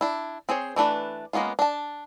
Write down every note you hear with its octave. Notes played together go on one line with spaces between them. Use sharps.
D4 E4
C4 G#4 C5 C#5
E3 A3 D4 B4
G#3 A#3 B3 C#4 F4
D4 A5